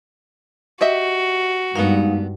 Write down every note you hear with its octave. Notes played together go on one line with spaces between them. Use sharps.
F#4 G4 D#5 E5
G2 G#3 B3 D#4 A#4 F5